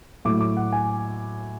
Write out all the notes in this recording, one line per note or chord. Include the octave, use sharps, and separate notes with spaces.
A2 F#3 A3 D6
D6
F#5
G#5